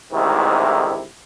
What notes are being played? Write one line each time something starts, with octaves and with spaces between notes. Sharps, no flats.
A1 D2 G#2 C3 D#3 E4